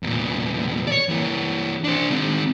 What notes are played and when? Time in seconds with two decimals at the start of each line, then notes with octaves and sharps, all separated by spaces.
0.03 E2 A#2
0.87 C#5 D5
1.09 E3 A#3
1.84 D4 C5
2.10 D#3 C4